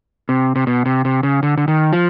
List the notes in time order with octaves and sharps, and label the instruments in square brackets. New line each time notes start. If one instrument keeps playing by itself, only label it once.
[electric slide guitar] C3
C3
B2
C3
C3
C#3
D3
D3
D#3
F3